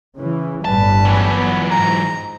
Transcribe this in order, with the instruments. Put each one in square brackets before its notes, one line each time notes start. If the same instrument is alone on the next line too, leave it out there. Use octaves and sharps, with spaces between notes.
[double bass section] C#3 E3
[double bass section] G1 A2 G3 [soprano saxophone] B4 [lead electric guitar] A5
[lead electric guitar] E3 F#3
[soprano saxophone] B3
[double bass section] G#2 [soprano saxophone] A#5